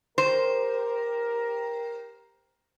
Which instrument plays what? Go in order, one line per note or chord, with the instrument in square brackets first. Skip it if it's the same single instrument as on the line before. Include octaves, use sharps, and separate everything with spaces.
[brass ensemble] G4 A#4 [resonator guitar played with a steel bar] C5